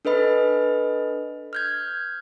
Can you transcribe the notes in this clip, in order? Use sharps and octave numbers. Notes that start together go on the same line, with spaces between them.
D4 A4 B4 D#5 B5
F6 G6 G#6